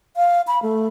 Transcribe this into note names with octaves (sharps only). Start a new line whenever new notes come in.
F5
B5
A3